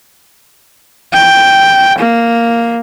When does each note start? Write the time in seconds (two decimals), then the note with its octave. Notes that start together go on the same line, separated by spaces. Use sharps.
1.13 G5
1.99 A#3